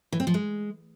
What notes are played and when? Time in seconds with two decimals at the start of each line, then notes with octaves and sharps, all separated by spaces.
0.12 E3
0.20 C4
0.27 F3
0.34 G#3